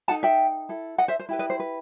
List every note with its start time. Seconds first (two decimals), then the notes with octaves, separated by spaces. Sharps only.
0.08 D#4 A4 F#5 A5
0.23 E5 G5
0.69 E4 A4
0.98 D#5 F#5
1.08 C5 E5
1.19 C5
1.29 E4 G4 B4
1.39 B4 D#5
1.50 C5
1.60 B4